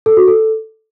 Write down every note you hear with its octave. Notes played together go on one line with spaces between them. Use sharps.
A4
F#4
A4